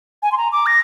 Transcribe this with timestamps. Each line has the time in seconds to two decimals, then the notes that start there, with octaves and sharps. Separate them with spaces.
0.22 G#5
0.32 C6
0.37 A#5
0.52 D6
0.66 A#6